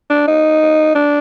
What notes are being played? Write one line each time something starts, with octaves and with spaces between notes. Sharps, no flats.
D4
D#4
D4